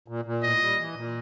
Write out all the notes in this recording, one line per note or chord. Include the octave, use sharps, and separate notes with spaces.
A#2
A#2
A2 D#5
G3
E3
A#2